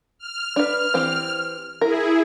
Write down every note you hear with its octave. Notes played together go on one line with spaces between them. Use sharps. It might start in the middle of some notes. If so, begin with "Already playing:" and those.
F6
D4 B4
E3 C4 G4
E4 G#4 A#4